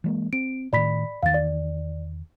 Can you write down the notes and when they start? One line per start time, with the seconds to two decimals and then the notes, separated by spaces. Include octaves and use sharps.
0.04 E3 G#3 A#3
0.33 C4 D7
0.73 A2 D#3 D5 B5 B6
1.23 E2 D#3 F5 A6
1.34 D5